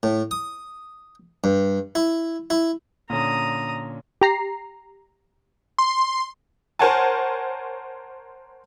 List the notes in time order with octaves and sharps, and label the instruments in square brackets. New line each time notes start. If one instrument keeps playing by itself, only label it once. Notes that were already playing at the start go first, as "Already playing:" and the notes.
[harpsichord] A2
D#6
G2
E4
E4
[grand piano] A#2 D3 C#4 [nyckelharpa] A#5 D#6
[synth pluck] G4 A#5 C7
[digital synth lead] C6
[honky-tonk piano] A#4 C5 C#5 F#5 G#5 A5